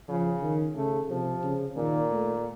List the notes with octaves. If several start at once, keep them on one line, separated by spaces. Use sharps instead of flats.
C#3 F3
D#3
C#3 A3
C3 F3
C#3
A#2 D#3
A3